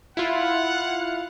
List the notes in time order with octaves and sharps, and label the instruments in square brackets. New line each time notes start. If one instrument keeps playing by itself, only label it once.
[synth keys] E4 F4 [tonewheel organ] F5 [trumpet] F#5